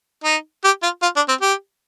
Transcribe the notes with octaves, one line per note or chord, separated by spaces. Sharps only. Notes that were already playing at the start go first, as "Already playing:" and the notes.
D#4
G4
F4
F4
D4
C4
G4